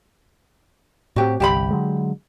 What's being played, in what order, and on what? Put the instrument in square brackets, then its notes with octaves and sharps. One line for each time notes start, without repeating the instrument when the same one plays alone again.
[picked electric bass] A2 B3 C4 [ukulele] F#4 G4
[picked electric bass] G1 C2 [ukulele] G4 A5 B5
[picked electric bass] D3 F#3 G#3